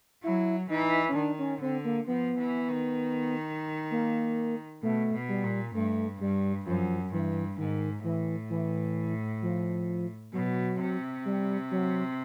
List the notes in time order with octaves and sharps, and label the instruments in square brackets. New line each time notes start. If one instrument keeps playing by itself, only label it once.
[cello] F#3 [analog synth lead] E4
[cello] E3 [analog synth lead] D#4
[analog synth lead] C#4
[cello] D#3 [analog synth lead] D4
[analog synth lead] C#4
[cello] D3 [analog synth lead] C4
[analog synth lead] A#3
[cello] F3 [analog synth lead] B3
[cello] E3
D#3
[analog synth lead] A#3
[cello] B2 [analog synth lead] A3
[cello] B2
[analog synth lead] G3
[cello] A#2
[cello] G2 [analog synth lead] A3
[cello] G2 [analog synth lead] G3
[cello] F#2 [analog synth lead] F3
[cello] G2 [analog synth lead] E3
[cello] G#2 [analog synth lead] D#3
[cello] A2 [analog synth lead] E3
[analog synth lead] E3
F3
[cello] B2 [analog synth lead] F#3
[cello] C3
[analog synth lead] G3
F#3